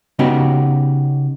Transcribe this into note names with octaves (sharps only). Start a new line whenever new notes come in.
C#3 B3 C#4 D#4 F#4 G4